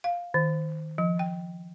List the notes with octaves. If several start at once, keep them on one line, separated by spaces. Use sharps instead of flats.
F5
D#3
F3
G5